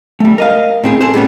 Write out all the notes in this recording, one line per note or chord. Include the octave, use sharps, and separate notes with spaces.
G3 A3
A#4 D#5 F5
A2 C4 G#4
C4 G#4 A4 C5
A2 G3 B3 C#4